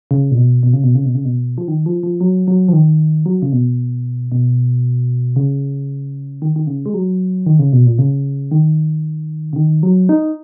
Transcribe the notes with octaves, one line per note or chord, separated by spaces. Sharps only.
C#3
A#2
B2
B2
C#3
B2
C#3
B2
C#3
B2
F3
D#3
F3
F3
F#3
F#3
F3
D#3
F#3
C#3
B2
B2
C#3
D#3
D#3
C#3
G#3
F#3
D#3
C#3
B2
A#2
C#3
D#3
C#3
D#3
F#3
D#4